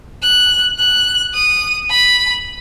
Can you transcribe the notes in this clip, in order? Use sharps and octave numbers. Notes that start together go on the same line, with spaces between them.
F#6
F#6
D#6
B5